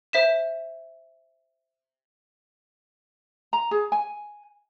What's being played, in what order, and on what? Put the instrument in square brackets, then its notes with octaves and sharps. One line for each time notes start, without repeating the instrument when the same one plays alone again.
[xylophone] C5 E5 B6 E7
[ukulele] A#5
G#4
G#5